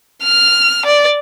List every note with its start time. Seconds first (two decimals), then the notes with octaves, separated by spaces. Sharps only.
0.23 F6
0.86 D5